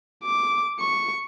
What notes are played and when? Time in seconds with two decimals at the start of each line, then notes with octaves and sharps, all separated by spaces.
0.24 D6
0.80 C#6